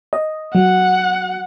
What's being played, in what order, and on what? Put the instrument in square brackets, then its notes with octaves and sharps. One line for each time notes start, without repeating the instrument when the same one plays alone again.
[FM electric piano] D#5
[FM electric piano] F#3 [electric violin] F#5